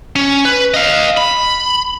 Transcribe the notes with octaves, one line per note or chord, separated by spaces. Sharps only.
C#4
B4
D#5 F5
B5